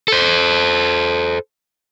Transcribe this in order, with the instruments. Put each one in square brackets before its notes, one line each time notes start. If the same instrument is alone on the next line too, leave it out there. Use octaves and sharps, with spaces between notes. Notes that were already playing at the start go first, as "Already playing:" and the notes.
[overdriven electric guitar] A4 C5